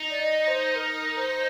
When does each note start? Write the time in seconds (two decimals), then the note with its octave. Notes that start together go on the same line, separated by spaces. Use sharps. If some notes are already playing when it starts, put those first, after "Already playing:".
Already playing: D#4
0.10 D5
0.21 D#5
0.48 C5
0.76 A#4
1.17 C5